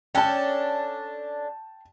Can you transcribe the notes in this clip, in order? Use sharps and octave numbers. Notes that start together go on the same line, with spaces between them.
C#4 D4 A4 G5 A5